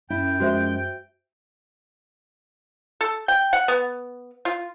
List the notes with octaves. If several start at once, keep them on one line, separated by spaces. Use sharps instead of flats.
F#2 E4 G5
F3 G#3 F#4 C5 E5
A4
G5
F#5
B3
F4